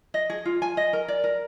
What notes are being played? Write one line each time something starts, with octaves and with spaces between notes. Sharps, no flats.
D#5
G#4
F4
G#5
D#5
A#4
D5
A#4